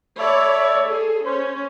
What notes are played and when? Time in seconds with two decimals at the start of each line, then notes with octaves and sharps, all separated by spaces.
0.18 A4 C#5 D5 E5 B5
0.84 G#4 A4
1.24 C#4 C5 C#5